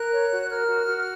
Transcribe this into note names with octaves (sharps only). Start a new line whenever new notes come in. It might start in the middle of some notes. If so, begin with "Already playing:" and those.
Already playing: A#4 F#6
C#5
F#4
A#4 F6
F#4
F#4